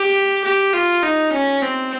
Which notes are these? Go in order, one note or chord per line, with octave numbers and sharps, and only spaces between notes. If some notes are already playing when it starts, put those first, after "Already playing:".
Already playing: G4
G4
F4
D#4
C#4
C4